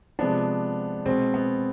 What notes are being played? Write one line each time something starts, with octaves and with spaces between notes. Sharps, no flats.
C3 F3 G#3 B3 D4
B2 G#3 C4
B3